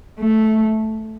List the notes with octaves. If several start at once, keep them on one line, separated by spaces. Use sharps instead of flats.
A3